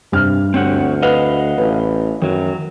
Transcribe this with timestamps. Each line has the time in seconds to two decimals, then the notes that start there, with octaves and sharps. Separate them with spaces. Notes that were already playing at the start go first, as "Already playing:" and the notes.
0.12 G2 C3 F6
0.54 D2 C4 C#5 F#5
1.03 B4 D#5 F5 F#5
1.58 A1 B4
2.22 F#2 D#3 F#3